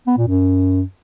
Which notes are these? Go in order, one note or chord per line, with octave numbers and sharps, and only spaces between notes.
B3
A#2
F#2